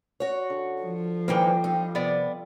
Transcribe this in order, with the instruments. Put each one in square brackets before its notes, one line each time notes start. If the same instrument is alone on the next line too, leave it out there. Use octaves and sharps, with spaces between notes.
[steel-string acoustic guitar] F#4 C#5
[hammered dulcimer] D3
[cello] F3
[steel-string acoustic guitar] D#3 E3 C4 [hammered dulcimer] G3 F4 [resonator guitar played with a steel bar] A#3 G5
[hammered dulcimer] C4 G4 [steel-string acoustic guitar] D#4
[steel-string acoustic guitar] C3 [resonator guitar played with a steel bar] B3 D5